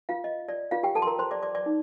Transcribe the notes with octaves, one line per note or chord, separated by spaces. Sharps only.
F4 F5
D#5
D5
F4 F5
G4 G5
A4 A5
C6
A#4 A#5
C5 C6
D5 D6
D5 D6
D5 D6
D#4